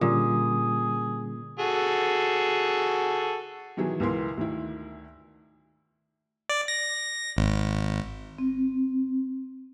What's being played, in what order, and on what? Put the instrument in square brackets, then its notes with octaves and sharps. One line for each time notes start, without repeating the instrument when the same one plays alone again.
[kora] A#2 [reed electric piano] D3 G3 C#4 [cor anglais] G#4
[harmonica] F#4 G#4 A4
[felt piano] B2 D#3 E3 F#3 G#4
C#2 B2 E3 E4 A#4 C6
D2 D#3 E4
[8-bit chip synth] D5
A#6
G#1
[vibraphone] C4